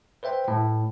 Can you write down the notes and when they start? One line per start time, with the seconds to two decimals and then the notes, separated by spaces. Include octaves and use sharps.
0.23 B4 C5 E5 G5
0.48 A2